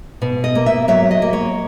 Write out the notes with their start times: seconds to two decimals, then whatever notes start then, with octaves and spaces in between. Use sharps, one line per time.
0.22 B2
0.44 D#5
0.55 A#3
0.66 E5
0.88 F#3 E5
1.11 D#5
1.22 A#3
1.33 C#5